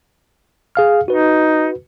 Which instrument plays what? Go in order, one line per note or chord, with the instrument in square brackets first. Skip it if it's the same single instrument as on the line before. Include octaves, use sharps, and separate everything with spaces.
[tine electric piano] G#4 F5 F6
[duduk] D#4 [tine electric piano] F#4 B4